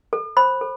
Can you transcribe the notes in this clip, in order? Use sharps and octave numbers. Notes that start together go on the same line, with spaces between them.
A4
C5 B5
A4